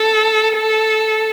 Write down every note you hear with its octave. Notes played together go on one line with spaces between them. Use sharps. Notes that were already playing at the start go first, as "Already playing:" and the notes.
Already playing: A4
A4